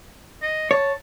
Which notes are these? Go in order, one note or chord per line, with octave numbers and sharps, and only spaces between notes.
D#5
C#5 A5